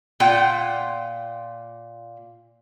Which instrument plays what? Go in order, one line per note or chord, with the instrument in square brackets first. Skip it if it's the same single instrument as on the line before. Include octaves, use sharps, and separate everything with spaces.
[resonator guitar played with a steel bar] A#2 F4 F#5 G5